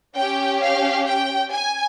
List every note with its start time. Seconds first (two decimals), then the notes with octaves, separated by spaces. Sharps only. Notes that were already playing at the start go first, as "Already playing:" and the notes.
0.16 C#4 G4 G5
0.61 F5
1.06 G5
1.52 G#5